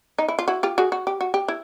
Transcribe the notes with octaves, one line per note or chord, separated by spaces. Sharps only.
D#4
E4
F4
E4 F#4
F4 G4
F#4 G#4
F#4
G4
F#4
G4
E4